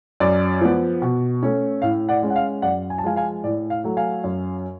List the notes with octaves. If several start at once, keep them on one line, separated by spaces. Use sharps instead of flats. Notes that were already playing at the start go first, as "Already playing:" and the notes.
F#2 D5
F3 B3
B2
A3 C#4
A2 F5
D5 F#5
G#3 C#4
F#5
F5
F#2 D5 F#5
G#5
A5
F3 G#3 F5 G#5
F5 G#5
A2 D5
F5
F#3 A3
F5 G#5
F#2